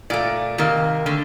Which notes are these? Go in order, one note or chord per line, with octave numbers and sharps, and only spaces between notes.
A#2 A3 D5
C3 D#3 A#3
D3 A3